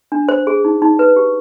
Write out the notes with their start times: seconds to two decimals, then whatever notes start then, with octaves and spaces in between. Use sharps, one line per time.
0.12 D4
0.29 C5
0.47 G#4
0.65 D#4
0.82 D#4
0.99 B4
1.16 G4